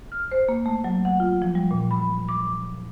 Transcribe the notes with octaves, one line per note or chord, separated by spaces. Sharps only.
F6
C5
A#3
A3
F#3
F#5
F4
F3
G3
A#2
B5
D6